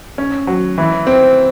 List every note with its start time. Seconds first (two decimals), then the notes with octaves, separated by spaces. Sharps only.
0.18 C#4
0.47 F#3
0.78 E3
1.07 C4